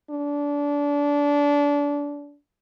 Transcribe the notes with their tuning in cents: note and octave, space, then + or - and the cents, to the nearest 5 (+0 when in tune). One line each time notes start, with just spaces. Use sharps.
D4 -25